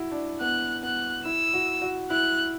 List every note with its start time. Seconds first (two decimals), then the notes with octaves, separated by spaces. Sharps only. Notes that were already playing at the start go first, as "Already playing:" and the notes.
Already playing: E4 F#4
0.12 D4
0.41 B3 F#6
0.83 B3 F#6
1.25 E4 E6
1.54 F#4
1.82 F#4
2.10 E4 F#6